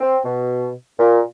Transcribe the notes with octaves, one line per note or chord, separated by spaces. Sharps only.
C4
B2
A#2